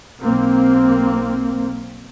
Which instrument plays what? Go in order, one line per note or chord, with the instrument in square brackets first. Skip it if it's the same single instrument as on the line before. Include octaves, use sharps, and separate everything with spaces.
[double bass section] B1 A#3 C4